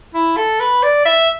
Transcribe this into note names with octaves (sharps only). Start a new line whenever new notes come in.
E4
A4
B4
D5
E5